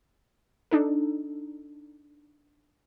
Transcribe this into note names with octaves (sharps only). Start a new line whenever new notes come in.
D4 D#4 A4